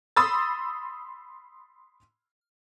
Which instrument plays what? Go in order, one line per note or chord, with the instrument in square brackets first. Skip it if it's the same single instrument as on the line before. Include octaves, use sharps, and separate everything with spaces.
[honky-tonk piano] B5 C6 D#6 E6 A6